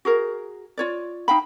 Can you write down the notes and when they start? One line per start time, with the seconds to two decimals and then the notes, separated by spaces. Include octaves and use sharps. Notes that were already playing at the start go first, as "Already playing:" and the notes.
0.05 F#4 G#4 A#4
0.78 F4 C#5 D5
1.28 D#4 F5 G5 B5